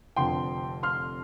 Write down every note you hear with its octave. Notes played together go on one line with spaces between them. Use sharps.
F1 F2 D3 F3 G5 C6
C6 F6